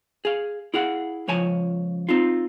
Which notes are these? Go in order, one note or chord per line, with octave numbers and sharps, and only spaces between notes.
G#4 F5
E4 G#4 F5 F#5
C#2 F3 C#5 G#5 A5
C4 D#4 F4